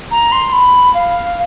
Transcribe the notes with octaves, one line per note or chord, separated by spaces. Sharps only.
A#5
C6
B5
F5